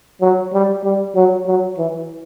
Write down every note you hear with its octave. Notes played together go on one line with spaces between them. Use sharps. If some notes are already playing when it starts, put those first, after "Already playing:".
F#3
G3
G3
F#3
F#3
E3